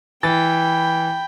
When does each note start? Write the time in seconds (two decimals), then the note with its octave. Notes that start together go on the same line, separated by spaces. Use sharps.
0.23 E3 G5 B5 A6